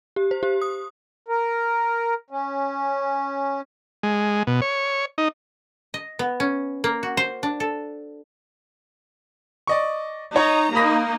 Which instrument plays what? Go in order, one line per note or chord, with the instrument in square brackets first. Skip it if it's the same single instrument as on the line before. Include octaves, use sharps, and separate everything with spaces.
[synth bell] G4
C5
G4
D#6
[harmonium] A#4
C#4
[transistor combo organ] G#3
B2
C#5
D#4
[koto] D#5
B3
C#4
A#3
F#4
C5
D4
A4
[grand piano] D5 D#5 C#6
[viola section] D#4 A#5 [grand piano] C#5
[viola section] A#3 D#4 [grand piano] B5 D#6 A#6